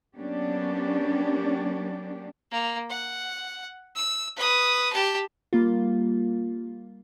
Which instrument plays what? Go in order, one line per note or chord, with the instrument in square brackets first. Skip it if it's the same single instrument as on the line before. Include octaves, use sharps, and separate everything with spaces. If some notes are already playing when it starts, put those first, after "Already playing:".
[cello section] F#3 A#3 B3 C#4 D4 G4
[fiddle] A#3
F#5
E6
B4 D#6
G4 A5
[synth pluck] G3 A#3 F4